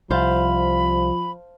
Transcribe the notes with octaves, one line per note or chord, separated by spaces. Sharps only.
C2 F3 C5 F5 A5 B5